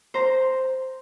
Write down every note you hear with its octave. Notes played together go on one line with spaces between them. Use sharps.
C5 A#5